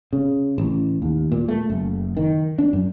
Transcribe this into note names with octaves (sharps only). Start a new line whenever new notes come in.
C#3
A1
D#2
A#2
A3
F#1
D#3
D4
F#2